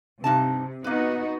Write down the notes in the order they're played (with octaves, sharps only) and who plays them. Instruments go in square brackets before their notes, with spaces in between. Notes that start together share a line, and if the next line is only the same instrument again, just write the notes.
[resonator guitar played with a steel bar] G2 D#4 A5 [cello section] C3
[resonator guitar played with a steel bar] A#3 B4 [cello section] B3 D#4 F#4